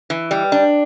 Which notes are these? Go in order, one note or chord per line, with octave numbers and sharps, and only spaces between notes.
E3
G3
D4